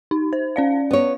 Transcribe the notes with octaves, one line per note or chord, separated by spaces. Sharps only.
D#4
C5
C#4 D5 F5
B3 C#5